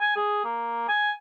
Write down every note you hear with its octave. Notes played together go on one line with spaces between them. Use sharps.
G#5
G#4
A#3
G#5